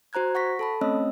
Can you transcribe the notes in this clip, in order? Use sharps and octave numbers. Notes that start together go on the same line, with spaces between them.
F#4 C5 A#5 F#6 G#6
F#5 C#6 A#6 B6
A4 A5 B5
A3 C4 C#4 C#5 D#5 E6